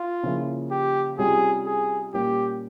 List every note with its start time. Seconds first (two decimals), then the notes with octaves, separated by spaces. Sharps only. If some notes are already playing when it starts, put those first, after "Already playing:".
Already playing: F4
0.23 C#3 F3 A#3 E4
0.71 G4
1.18 C3 G3 C#4 F4 G#4
1.66 G#4
2.14 A#2 G3 A#3 C#4 G4